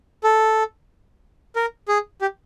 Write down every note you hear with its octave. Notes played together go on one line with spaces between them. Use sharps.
A4
A#4
G#4
G4